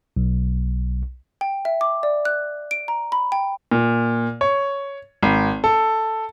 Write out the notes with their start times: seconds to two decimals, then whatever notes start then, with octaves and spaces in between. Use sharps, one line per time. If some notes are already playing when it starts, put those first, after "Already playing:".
0.17 B1
1.41 G5
1.65 E5
1.81 D6
2.03 D5
2.25 F#6
2.71 D7
2.88 A#5
3.12 B5
3.32 G5
3.72 A#2
4.41 C#5
5.22 G#1
5.64 A4